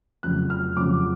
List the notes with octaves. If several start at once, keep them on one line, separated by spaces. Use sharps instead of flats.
F1 F2 C#3 F#3 F#6
F6
F1 F2 C#3 F#3 D6